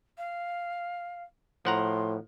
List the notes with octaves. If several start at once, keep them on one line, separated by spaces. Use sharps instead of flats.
F5
A2 F3 F#5 A#5 C6